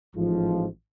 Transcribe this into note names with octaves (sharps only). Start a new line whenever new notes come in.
A1 G#2 F3